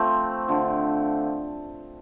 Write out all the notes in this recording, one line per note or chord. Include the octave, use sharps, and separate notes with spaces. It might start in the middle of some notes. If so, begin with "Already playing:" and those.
Already playing: F3 A3 C4
D3 F3 A3